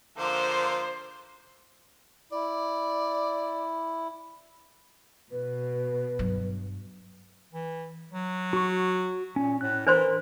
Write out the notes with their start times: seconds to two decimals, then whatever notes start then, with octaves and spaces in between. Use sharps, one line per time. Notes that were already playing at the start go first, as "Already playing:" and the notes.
0.18 D3 F3 A#3 C5
2.32 E4 D5
5.32 B2 B4
6.19 G2 F#3
7.53 E3
8.12 F#3
8.53 F#4 C#6
9.36 A#2 C#4
9.61 A2 F#6
9.87 E3 D4 A#4 C5 C6